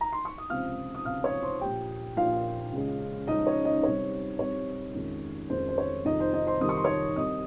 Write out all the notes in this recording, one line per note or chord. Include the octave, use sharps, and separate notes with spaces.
A#5
C6
C#6
D#6
C#2 C3 F3 C4 F5 F6
D#6
C#2 C3 F3 C4 F5 F6
C#5 C#6
C5 C6
A#1 A#2 F3 G4 G5
A#1 A#2 F3 F4 F5
C#2 C#3 F3 G#3 C#4
C#2 C#3 F3 G#3 C#4 D#4 D#5
C#5
D#4 D#5
C2 C3 G3 C4 C#5
C2 C3 G3 C4 C#5
F2 D#3 G#3 C#4
F2 D#3 G#3 C#4 C5
C5
C#5
F2 C3 D#3 G3 D#4 D#5
C5
D#4 D#5
C5 C6
F2 C3 D#3 G3 D#6
C#6
C6
C#5 C#6
C2 C3 G3 D#5 D#6